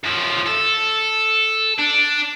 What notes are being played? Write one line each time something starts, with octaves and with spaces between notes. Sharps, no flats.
F#2 F3
A4
D4